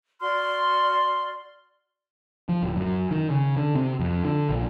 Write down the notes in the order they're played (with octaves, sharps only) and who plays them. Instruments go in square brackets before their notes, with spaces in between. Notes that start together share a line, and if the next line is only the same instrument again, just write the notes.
[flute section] F#4 D5 C6 F6
[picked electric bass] F3
D1
F#2
D#3
C#3
D3
C3
F2
D3
A#1